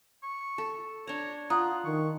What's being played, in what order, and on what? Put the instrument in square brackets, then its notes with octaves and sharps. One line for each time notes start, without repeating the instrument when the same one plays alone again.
[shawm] C#6
[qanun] A4
[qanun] D4 A#5 [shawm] C#5
[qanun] F4 [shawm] F#5 [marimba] A#5 D#6
[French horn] D#3 [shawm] C#6